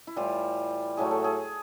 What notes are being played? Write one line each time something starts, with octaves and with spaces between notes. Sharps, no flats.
E4
A2 E3 G3 F4
A2 F#3 A3 G#4
A4
G#4